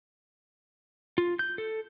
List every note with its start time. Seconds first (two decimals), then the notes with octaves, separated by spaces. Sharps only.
1.18 F4
1.39 G6
1.58 A4